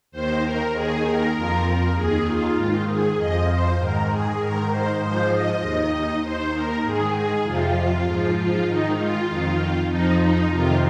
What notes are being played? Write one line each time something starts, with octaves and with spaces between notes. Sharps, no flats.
D#2 D#3 C5
A#4
D#2 D#3 G#4
A#4
F2 F3 A#4
A#4
D#2 D#3 G#4
F4
G#2 D#3
G#4
F2 F3 D#5
C5
G#2 D#3 A#4
G#4
G#2 D#3 A#4
C5
G#2 F3 C5
D#5
D#2 D#3
D#2 D#3 C5
A#4
G#2 D#3 G#4
G#4
F2 C3 F3 F4
G#2 F3
F4
G#2 D#3 D#4
F4
F2 D#3
F2 F3 D#4
D#4
F2 C3 D#3 F4